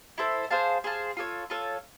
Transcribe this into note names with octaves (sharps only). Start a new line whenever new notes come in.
E4 A4 C5
G#4 C5 F5 A5
G#4 C5 F5 A5
F4 A4 C#5
F4 A4 C#5